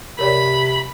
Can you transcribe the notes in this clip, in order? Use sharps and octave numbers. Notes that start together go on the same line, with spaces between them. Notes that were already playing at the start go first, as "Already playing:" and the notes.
C3 A#4 C#5 D5 B5